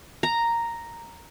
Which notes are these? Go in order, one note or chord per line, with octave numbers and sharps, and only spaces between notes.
A#5